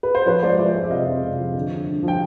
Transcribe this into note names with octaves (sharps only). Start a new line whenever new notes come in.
B4
C5
F3 B4 C#5
G#3 C5 D5
F3 D5 E5
G#3
E5
C3 D#5 F5
F2
C3
F3
D3
D3
G2
F3 G5